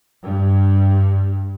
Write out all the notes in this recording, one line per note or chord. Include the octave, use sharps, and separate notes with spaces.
G2